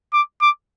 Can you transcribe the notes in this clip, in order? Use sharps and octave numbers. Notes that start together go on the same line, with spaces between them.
D6
D6